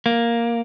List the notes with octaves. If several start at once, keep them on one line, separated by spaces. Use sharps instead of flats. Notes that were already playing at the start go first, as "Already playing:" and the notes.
A#3